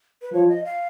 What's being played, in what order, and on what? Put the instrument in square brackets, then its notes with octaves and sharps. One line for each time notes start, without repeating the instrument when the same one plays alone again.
[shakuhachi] B4
[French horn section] F3 [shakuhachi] C#5
[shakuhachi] D#5
F5